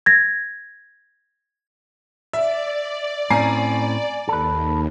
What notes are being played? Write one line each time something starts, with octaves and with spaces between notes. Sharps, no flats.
G#6 A#6
D5 E5
A2 C4 C#4 G#5 A#5 C7
D#2 A4 B4